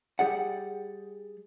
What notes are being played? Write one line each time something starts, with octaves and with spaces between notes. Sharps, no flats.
G3 G4 G#4 D5 F#5